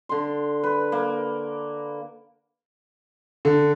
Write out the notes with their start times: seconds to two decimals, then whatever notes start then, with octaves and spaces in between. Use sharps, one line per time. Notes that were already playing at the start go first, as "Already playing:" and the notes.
0.09 D3 C6
0.63 B4
0.92 A#3
3.45 D3